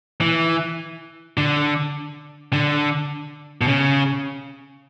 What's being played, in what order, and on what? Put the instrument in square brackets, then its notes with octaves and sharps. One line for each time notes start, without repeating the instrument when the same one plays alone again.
[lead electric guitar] E3
D3
D3
B2
C#3